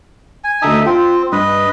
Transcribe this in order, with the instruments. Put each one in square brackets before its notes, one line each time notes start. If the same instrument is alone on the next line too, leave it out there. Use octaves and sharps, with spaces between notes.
[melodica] G#5
[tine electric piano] D2 D3 A5 [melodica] D#4 E5 D#6
[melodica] C4 [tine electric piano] F4 G5
[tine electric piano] G2 [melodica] B4 D#5